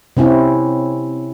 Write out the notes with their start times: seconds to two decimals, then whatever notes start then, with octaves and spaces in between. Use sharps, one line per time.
0.17 C3 C4 C#4 E4